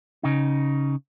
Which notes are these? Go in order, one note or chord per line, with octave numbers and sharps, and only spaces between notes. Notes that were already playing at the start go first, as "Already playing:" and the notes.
C#3 D#4